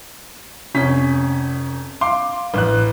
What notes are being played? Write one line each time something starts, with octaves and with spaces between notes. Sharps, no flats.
F1 C#4 B6
F5 C6 D6
A1 F#6